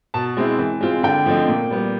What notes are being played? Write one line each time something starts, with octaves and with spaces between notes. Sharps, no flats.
B2 A5
G#3 C4 E4
E3
G#3 C4 F4
D3 G5
F3 A3 C4 D#4
A#2
G3 B3